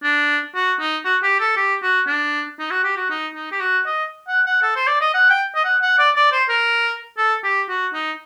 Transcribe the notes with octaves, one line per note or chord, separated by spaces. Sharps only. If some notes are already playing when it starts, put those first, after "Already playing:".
D4
F#4
D#4
F#4
G4
A4
G4
F#4
D4
D#4
F#4
G4
F#4
D#4
D#4
G4
F#4
D#5
F#5
F#5
A4
C5
D5
D#5
F#5
G5
D#5
F#5
F#5
D5
D5
C5
A#4
A4
G4
F#4
D#4